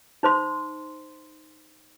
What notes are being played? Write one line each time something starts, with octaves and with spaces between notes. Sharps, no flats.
D#4 C5 C6